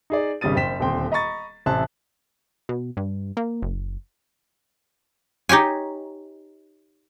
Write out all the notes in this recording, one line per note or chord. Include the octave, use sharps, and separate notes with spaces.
D#4 G#4 D5
G#1 C#3 G3 D#6 A6 D#7
F#1 C5 G5 B6 E7
D#1 D2 C4 G5 C6
D#5 A#5 B5 C#6 A6
A1 C3 C5 E5 A5 F#6
B2
G2
A#3
F#1
D#4 G4 C#5 G#5